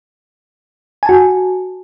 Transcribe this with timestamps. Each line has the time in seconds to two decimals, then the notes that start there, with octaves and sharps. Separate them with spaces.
1.03 G#5
1.06 A5
1.09 F#4